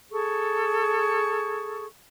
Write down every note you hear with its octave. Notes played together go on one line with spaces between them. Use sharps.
G#4 A4 C#6